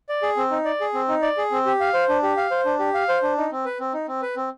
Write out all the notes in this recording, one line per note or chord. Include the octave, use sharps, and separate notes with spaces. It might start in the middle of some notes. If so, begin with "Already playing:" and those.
D5
G#4
C4
D#4
D5
G#4
C4
D#4
D5
G#4
C4
G4
F5
C5
D4
G4
F5
C5
D4
G4
F5
C5
D4
D#4
C4
B4
C4
D#4
C4
B4
C4